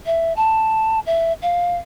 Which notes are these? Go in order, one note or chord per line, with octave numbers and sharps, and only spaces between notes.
E5
A5
E5
F5